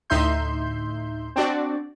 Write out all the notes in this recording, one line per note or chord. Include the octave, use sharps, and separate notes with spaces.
D2 A2 D#4 E5 C6 G6
C4 D4 F#4 D5